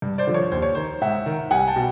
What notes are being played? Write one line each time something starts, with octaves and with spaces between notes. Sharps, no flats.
G2
C5 D5
D3 F3
C#5
D#2 C5
C#5
D#3 C5
G#2 E5 F#5
D#3
C2 F#5 G#5
G5 A5
B2